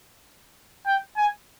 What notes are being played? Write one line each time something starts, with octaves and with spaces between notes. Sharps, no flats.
G5
G#5